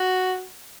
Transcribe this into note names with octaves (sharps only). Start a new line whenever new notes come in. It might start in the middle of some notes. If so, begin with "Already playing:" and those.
Already playing: F#4